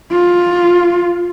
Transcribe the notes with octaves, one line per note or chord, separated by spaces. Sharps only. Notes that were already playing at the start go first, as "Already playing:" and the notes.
F4